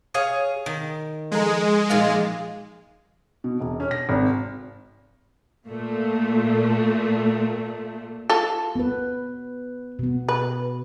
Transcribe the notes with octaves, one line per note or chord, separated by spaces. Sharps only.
G#4 C#5 F5
D#3
F3 G#3 A4 A#5
A#2 F3 D#4 F4 G#4 F5
B2
E1
C#4
A#6
G#1
A#2 A3
F4 A4
B3 B4
B2 B3
B4